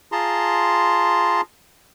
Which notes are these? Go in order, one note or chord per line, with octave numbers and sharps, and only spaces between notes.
F4 G#4 A5 A#5 C6